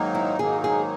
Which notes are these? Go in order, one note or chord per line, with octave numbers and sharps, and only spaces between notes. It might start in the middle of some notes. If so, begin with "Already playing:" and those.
Already playing: G#2 D#3 F#3 A#3 D#4
E4
G#2 D#3 F#3 A#3 D#4 G#4
G#4